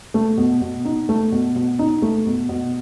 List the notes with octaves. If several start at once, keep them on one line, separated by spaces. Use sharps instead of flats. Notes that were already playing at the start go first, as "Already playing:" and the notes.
A3
B2
B2
D#4
A3
B2
B2
D#4
A3
B2
B2